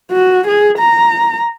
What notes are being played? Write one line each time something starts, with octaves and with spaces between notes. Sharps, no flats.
F#4
G#4
A#5